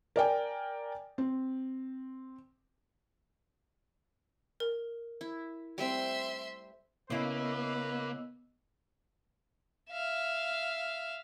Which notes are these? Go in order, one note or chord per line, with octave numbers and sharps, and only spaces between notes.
A#4 D5 G5 G#5
C4
A#4
E4
G3 A3 C4 E5 C6
C#3 A#3 B3 E4 B4 D#5 E6
E5 F5